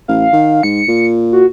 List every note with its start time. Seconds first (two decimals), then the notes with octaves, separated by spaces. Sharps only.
0.08 A1 F5
0.33 D#3
0.63 G#2 C#7
0.88 A#2
1.33 F#4